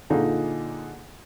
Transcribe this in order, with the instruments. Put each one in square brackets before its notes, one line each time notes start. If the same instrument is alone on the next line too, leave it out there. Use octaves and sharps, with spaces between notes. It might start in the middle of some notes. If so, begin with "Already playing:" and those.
[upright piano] A#2 D3 D#4 F4 G#4